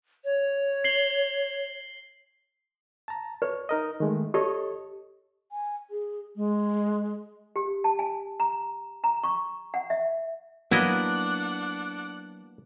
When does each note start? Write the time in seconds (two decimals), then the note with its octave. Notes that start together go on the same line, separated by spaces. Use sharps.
0.24 C#5
0.84 C7 F#7 G7
3.08 A5 A#5
3.42 B4 C#5
3.69 D#4 A#4 D#5
4.00 D#3 G#3 A3
4.34 G4 A4 C#5 D#5
5.52 G#5
5.90 G#4
6.36 G#3
7.56 G4
7.84 A5
7.99 G#5
8.40 A#5
9.04 A#5
9.24 C#6
9.74 F#5
9.90 E5
10.71 F#3 A#3 B3 D4 E4 D#5 F#5